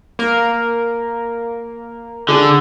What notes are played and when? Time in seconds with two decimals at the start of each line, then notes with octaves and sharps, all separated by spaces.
0.19 A#3 A#4
2.28 D3 D4 G#4